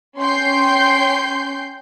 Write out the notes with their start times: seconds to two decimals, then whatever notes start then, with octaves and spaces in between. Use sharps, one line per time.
0.17 C#4 G5 C6 G6 C7